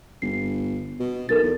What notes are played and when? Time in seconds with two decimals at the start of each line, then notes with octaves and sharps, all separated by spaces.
0.22 G1 C7
1.00 B2
1.29 B1 A4 A#4 A6
1.43 E2